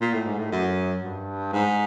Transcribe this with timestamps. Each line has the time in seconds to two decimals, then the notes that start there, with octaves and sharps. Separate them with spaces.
0.01 A#2
0.13 A2
0.26 G#2
0.39 A2
0.52 F#2
1.03 G2
1.53 G#2